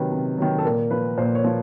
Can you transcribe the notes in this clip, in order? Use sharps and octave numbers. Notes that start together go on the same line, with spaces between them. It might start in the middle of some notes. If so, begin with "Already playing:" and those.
Already playing: C3 D#3 F#3 B4
C3
D#3 F#3
A4
A#2 A#4
F3 B4
A#2 C5
C#5
F3